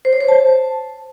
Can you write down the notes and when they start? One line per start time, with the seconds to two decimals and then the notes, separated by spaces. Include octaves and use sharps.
0.05 C5
0.13 C#5
0.21 C5
0.28 A5